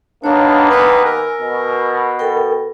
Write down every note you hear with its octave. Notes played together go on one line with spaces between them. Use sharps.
D#2 A#3 B3 D4 C#5 F5
B4 G#5 E6
A#4
B2
A4 A#4 G5